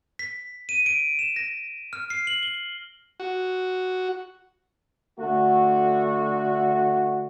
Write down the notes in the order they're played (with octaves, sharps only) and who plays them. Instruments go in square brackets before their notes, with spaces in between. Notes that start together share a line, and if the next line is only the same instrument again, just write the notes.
[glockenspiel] B6
D#7
D7
E7
A#6
F6
C7
F#7
G7
[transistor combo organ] F#4
[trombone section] D3 A3 F#4